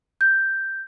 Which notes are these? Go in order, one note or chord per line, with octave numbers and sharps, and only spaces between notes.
G6